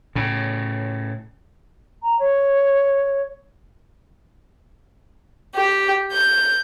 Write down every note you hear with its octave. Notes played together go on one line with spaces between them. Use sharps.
A2 C#3
A#5
C#5
G4
G6